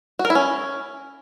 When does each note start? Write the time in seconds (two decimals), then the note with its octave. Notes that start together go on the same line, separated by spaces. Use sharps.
0.19 F#4
0.25 A#4
0.30 E4
0.35 C#4